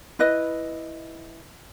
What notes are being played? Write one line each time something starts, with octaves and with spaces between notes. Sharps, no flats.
E4 B4 D#5